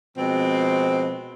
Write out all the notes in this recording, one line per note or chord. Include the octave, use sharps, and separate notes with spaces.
B2 F3 G#3 C4